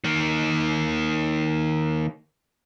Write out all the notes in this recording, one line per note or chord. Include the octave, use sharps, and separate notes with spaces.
D#3 A#3